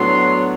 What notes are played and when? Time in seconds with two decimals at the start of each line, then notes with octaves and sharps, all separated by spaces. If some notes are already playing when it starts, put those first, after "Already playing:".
Already playing: A2 F#3 B3 D4 C6